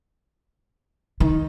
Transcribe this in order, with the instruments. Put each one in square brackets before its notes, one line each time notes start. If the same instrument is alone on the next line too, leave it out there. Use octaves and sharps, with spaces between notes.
[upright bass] D#3